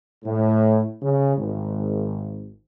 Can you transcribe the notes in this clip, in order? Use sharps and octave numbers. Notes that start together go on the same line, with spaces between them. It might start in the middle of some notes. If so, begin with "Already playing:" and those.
A2
C#3
G#1